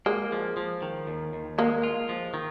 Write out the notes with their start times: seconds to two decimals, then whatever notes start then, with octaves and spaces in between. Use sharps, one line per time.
0.06 G#3 A#3
0.32 F3
0.57 F3
0.82 D#3
1.07 D#2
1.33 D#2
1.58 G#3 A#3
1.83 F4
2.09 F3
2.34 D#3